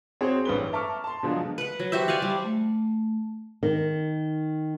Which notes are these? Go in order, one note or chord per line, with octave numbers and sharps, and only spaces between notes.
C4 F#4 G#4 C5 C#5
A1 G2 B4 G7
E5 A5 A#5 C#6 D6 F6
A5 C6
B2 D3 F3 F#3 G#3 F#4
B4 F#5
F#3
F#4 G4 C5 E5
D5 F5 F#5 G#5
G3
A3
D#3